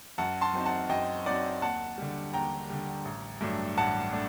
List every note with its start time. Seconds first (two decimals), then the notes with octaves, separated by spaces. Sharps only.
0.18 F#2 F#5 A5
0.41 A5 C6
0.53 F#3 C4 D#4
0.66 F#5 A5
0.89 F#2 D#5 G5
1.26 F#3 C4 D#4 D5 F#5
1.62 D#2 F#5 A5
1.98 D3 G3
2.33 D#2 G5 A#5
2.70 D3 G3
3.05 A1
3.41 G2 F#3 A3 D4
3.77 A1 F#5 A5
4.13 A3 D4